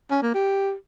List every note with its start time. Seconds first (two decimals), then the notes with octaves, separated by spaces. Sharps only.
0.11 C#4
0.22 A#3
0.34 G4